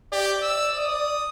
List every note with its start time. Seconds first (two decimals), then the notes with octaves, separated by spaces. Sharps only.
0.12 G4 D5
0.43 E6
0.76 D#6